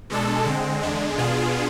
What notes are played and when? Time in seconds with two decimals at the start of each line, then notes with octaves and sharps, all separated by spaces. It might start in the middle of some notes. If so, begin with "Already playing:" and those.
0.10 B2 G#3 D4 A4
0.46 D3 G#3 C4
0.83 E2 D3 G#3 D4
1.17 B2 B3 D4 F4 G#4